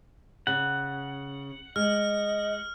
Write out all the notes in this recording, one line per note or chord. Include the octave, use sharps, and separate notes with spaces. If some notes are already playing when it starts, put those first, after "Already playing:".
C#3 F#5
G#3 D#5 F6